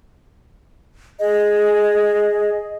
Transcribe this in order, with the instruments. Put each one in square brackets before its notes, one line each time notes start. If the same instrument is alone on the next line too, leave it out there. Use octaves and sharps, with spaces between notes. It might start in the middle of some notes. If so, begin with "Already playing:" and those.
[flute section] G#4 D#5